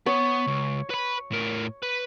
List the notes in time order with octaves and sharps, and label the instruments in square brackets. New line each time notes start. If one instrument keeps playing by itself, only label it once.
[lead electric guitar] B3 [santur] C#5
[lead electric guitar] C#2
B4 B5
A2 A#4
B4